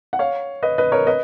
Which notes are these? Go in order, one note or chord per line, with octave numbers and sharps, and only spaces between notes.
F#5
C#5 F5
B4 D#5
B4 D#5
A#4 C#5
B4 D#5